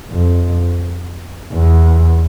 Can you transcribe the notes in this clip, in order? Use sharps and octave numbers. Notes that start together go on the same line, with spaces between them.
F2
E2